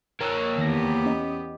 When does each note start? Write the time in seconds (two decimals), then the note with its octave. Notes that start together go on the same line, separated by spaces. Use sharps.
0.21 A#3 C#5 A#5 E6 F#6
0.58 E2 D#3 B3 G4 A#6
1.06 C#4 D#5